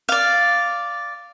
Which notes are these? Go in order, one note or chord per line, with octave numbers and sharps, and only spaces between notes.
D5 F5